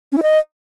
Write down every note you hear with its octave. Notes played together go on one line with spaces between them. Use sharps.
C#4
E4
D#5